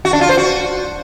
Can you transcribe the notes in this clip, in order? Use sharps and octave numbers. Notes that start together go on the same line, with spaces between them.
F#4
D4
F4
C5
F#4